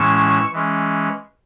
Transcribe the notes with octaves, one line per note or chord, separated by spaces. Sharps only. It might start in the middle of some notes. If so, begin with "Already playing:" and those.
Already playing: A2 E3 G#3 C#4 C#6 E6
E3 G#3 C#4